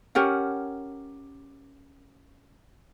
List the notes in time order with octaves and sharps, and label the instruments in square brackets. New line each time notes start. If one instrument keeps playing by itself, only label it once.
[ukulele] C#4 G4 A#4 F#5